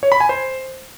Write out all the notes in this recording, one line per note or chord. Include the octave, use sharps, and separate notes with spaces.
C#5
B5
G#5
C5